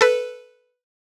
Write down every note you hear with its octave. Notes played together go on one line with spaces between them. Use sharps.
A4 B4